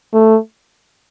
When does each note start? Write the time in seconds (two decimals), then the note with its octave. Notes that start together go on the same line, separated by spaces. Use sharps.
0.14 A3